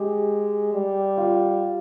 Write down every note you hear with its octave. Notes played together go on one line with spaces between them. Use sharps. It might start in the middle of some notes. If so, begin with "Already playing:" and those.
Already playing: G#3 G4
G3
F4